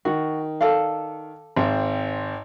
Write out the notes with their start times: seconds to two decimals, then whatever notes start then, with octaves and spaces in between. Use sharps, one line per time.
0.05 D#3 F#4
0.61 A4 D5 F5
1.56 G#1 C4